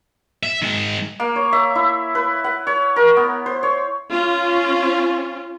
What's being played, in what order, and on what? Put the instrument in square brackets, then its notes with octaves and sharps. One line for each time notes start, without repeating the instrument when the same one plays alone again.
[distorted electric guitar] E5
D#3 G#3
[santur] A#3
C#5
E5
E4
B4
F#5
C#5
A#4
B3
C5
C#5
[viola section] C#4 F4